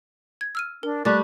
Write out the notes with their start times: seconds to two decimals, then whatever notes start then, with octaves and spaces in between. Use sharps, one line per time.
0.41 G#6
0.55 E6 F6 D#7
0.83 D4 A#4
1.05 G3 A3 D5 D6 F#6 A6